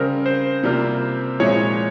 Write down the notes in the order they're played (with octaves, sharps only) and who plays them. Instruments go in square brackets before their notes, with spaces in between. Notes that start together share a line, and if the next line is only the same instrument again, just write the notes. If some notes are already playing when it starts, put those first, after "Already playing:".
Already playing: [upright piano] C#3 G3 C4 [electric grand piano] A#4
[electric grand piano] C5
[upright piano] C3 G3 A#3 F4
[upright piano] A#2 F3 G#3 E4 [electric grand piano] C#5